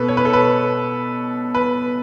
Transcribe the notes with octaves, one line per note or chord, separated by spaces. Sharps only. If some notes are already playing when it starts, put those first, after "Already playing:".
Already playing: B2 A4 B4
C#5
B4
A4
B4
B4